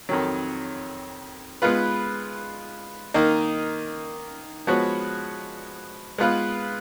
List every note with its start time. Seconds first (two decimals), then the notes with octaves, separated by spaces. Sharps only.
0.09 F2 D#3 F#3
1.62 G#3 B3 F4 B4
3.14 D#3 A#3 D#4
4.67 F3 G#3 B3 F#4 C#5
6.18 G#3 B3 F4 B4 F5